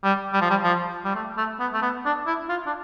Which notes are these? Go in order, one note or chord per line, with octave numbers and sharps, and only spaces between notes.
G3
G3
F3
G3
F3
G3
A3
A3
B3
A3
B3
D4
E4
F4
D4